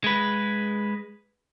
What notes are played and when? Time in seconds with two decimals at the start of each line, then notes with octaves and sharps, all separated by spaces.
0.04 G#3 B4